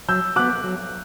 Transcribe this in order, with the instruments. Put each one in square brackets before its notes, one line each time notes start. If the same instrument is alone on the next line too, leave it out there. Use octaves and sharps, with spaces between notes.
[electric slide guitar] F#3 [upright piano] E6 G6
[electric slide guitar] B3 F#4 [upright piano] D6 F#6
[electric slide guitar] F#3